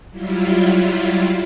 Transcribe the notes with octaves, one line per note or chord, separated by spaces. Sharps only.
F#3 G3 E4 F4